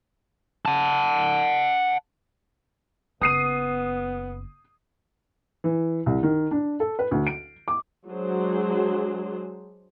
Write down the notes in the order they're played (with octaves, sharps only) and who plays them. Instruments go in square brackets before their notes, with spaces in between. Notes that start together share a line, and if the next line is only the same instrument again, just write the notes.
[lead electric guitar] F#5 A5
[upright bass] F#1 [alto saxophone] B3 [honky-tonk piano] D#6 C7 D#7
[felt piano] E3
C2
D#3
D4
A4
B4
D2
D7
D6
[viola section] F#3 G#3 D4 G#4 C5